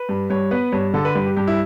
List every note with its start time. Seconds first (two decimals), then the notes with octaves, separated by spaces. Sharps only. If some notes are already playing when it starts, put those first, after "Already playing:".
Already playing: B4
0.09 G2
0.30 G2 C#5
0.51 B3 B4
0.72 G2 C#5
0.94 D3 A4
1.05 B4
1.15 G2 B4
1.26 G4
1.37 G2 G4
1.47 E4